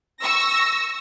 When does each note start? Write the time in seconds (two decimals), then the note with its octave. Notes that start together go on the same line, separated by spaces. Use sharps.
0.22 C#6 E6 A#6